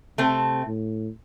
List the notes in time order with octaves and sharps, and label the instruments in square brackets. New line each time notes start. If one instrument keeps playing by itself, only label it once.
[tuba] C3 [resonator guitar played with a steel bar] A3 C4
[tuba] A2